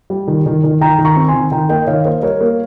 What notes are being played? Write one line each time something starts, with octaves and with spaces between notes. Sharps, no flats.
G3
D#3
D#3
D#3
D#3 G5 A#5
D#3
A#5 C#6
C4
G#5 C6
D#3
D#3 G5 A#5
A#3 D#5 G5
D#3 C#5 F5
A#3 C5 D#5
G3 A#4 C#5
A#3